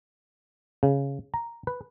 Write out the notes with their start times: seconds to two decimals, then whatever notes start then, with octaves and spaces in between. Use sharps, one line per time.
0.83 C#3
1.34 A#5
1.67 B4